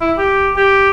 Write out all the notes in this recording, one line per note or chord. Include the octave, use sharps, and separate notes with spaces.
E4
G4
G4